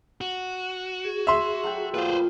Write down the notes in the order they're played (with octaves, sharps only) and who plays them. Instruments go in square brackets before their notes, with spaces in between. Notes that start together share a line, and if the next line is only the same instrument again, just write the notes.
[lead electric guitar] F#4
[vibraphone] G#4
[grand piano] E5 C6
[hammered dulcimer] F#3 A4 G5
[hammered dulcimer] A#2 F3 [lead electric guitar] B4 C5